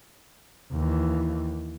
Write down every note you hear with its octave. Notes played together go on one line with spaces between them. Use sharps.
D#2 E3